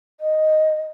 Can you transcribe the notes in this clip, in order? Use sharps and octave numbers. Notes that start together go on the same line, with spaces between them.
D#5